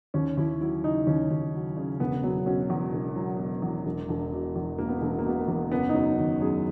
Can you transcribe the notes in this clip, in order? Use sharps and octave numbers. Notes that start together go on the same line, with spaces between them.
D#2 C#4
D#2 E4
F#3 E4
C#3 D#4
D#2 C#4
D#2
F#3
C#3
E1 B3
F#3 B3
B2 C#4
E2
E1
F#3
B2
E2
E1
E1
B2
E2
E1 A#3
B3
E1 A#3
B3
A#3
B2 B3
A#3
E2
F#1 B3
D#4
F#3 C#4
D#3
F#2 G#4